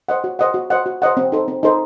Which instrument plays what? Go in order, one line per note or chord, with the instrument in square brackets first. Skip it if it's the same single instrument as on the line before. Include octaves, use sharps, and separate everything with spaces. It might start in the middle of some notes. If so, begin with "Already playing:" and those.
[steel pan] C5 D#5 F#5
F#4
C5 D#5 F#5
F#4
C5 D#5 F#5
F#4
C5 D#5 F#5
C4
D#4 A4 C5
C4
D#4 A4 C5